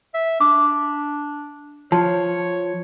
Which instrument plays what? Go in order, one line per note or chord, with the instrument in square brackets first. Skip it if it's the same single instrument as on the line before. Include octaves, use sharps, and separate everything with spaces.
[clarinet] E5
[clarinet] D4 [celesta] D6
[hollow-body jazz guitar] F3 [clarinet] C#5 [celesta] A5